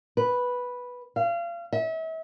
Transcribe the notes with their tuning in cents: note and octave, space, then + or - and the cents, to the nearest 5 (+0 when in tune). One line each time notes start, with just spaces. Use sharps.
B4 -5
F5 -30
E5 -35